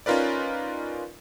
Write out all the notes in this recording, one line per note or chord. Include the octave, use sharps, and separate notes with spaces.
C#4 D#4 F4 A#4 B4 D5